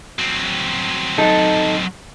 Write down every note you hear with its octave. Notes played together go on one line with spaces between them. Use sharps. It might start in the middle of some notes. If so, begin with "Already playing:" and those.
F#3 C4
D#4 A4